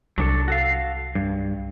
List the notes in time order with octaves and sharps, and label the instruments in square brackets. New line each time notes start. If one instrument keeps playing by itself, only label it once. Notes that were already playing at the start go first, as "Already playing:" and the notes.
[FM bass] C2 [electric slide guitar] F#3 D4 A4
[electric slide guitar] F#4 A4 F5
G2